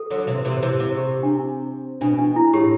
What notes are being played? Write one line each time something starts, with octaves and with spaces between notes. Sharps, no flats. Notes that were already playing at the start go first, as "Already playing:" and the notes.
Already playing: A4
D3 F#3
C3 E3
C3 E3
C3 E3
C3
G4
D4
B2 D4
D4
E4
A2 G4